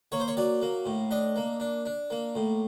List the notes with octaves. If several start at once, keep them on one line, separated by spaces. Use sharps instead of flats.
A#3 C#5
C5
C#5
F#3 D5
A#3
A2
D4 D#5
A#3
D4
D4
A#3
A2